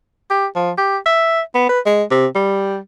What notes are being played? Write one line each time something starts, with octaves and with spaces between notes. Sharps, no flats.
G4
F3
G4
E5
B3
B4
G#3
C3
G3